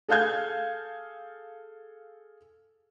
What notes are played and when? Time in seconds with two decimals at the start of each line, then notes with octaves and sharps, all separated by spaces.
0.08 G#4 A4 F5 G6 G#6